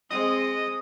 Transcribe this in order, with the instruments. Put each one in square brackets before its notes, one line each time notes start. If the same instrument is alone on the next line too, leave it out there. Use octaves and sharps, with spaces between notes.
[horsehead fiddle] G#3 [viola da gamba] C4 [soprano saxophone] D#5 [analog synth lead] D#6